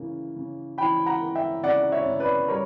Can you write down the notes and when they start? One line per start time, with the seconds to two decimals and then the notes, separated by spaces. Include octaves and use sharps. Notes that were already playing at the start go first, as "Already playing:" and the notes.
Already playing: C#3 E3 A#3
0.36 C#3
0.78 E3 G5 B5
1.06 F#5 A#5
1.21 A#3
1.35 E5 G5
1.63 C#3 D5 F#5
1.92 C#5 E5
2.06 C#3
2.20 B4 D5
2.48 G3 A#4 C#5